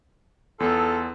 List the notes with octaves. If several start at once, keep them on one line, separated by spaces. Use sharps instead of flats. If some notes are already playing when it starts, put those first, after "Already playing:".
E2 F4 G#4 A4